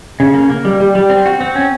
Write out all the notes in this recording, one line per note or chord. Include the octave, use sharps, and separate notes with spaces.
C#3
A#3
A#3
G3
G3
G3
C4
F#4
C4
C#4